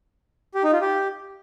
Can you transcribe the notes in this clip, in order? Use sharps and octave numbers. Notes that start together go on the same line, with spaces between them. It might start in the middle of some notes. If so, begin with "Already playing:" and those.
G4
D#4
F4
G4